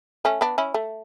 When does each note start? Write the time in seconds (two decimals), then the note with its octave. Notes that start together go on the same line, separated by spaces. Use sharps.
0.25 A3 C#4
0.41 B3 D4
0.58 C#4 E4
0.74 A3